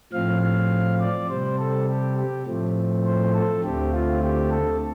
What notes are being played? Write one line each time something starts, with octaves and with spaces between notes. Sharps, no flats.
A2 F3 C4 F5
F5
D5
C3 G3 C4 C5
A4
G4
G4
A2 F3 A3 C4
C5
A4
D2 D3 A3 C4 G4
F4
G4
A4